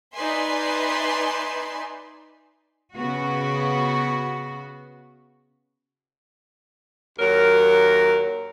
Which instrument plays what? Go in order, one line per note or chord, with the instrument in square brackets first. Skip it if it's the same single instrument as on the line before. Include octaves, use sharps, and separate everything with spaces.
[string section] D#4 B4 D5 E5 G#5 C6
[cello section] C#3 B3 F#4
[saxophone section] D#2 F#3 A#4